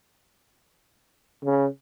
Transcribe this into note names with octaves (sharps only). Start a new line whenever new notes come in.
C#3